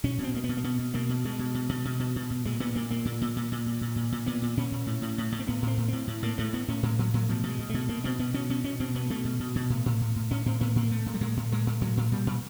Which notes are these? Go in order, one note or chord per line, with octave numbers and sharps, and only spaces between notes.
B2 C#4
B2 C4
B2 A#3
B3
B2
A#3
B2 B3
B2
B2 A#3
B2
B2 G#3
B2
B2
B2
B2
B2
B2
B2
A#2 G#3
A#2 B3
A#2 A#3
A#2 A#3
A#2
A#2
A#2
A#2
A#2
A#2
A#2
A#2
A#2 B3
A#2
A#2 C#4
A#2
A2
A2
A2
A2
C4
A2 B3
A2 C4
A2
A2 C4
A2
A2 A#3
A2 A3
A2 B3
A2 C#4
A2 G#3
A2 F#3
A2 F#3
B2 F3
B2
G#3
B2
B2 A3
B2 A#3
B2 C4
B2 B3
B2 C#4
B2 C#4
B2 C#4
B2 C4
B2 B3
B2 A3
B2
B2
B2
A2
A2
A2
A2
A2 C#4
A2 C4
A2 B3
A2 A#3
A2 A3
A2
G3
A2 G#3
A2
A2 G#3
A2
A2 F#3
A2
A#2 G3
A#2